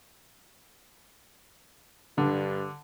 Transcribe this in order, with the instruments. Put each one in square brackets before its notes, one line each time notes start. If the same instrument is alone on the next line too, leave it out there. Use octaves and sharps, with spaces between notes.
[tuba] G2 [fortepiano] D3